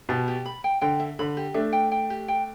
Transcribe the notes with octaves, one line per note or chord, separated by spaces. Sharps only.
B2 G4
G4
B5
G5
D3 G5
E5
D3 B5
G4
A3 D4 E5
G5
G5
G4
G5